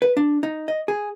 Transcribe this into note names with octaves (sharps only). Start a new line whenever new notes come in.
B4
D4
D#4
D#5
G#4